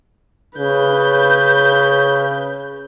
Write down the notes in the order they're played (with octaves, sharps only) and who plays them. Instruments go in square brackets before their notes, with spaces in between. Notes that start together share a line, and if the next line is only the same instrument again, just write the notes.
[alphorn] C#3 [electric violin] B4 G6